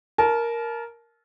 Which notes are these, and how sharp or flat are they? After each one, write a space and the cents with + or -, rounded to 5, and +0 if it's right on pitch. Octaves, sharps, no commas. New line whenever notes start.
A#4 +0 A5 -30